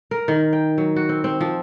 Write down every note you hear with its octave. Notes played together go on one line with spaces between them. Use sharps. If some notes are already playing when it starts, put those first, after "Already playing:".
A#4
D#3
G5
F#3
F#4
C4
C4
F3